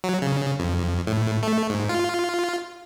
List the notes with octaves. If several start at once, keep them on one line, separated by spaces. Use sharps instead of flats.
F#3
C#3
F2
A2
A3
G#2
F4